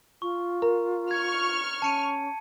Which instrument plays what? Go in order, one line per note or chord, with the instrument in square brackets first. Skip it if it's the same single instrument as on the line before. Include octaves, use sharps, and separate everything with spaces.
[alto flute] F4 [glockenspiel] C#6
[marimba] A#4 [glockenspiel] A#5
[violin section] C#6 F6 [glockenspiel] G#6
[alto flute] C#4 [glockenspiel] A5 C#7 D#7